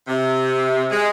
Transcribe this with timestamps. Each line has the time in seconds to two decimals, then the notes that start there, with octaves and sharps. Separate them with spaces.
0.08 C3
0.91 G#3